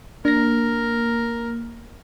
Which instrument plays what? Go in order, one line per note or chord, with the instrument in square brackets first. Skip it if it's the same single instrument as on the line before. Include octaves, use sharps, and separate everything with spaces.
[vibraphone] A#3 [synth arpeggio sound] D4 A#6 [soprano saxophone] A#4